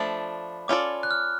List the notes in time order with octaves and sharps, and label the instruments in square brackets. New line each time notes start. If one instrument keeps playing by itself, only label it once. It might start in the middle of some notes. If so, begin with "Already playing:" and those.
Already playing: [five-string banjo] F3 A3 D4 [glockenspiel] B5
[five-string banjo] C#4 F4 A4 D5 [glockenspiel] D6
[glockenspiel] F#6
F6